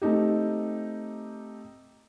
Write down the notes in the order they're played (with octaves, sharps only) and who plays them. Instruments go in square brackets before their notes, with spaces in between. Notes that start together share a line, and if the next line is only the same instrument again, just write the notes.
[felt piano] A3 C4 D#4 G4